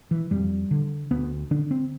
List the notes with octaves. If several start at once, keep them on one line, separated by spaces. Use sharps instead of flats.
E3
F2 G3
D3
D2 B3
D3 D4
C4